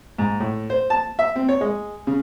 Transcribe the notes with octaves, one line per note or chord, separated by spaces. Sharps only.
G#2
A2
C5
A5
E5
C4
C#5
G#3
C#3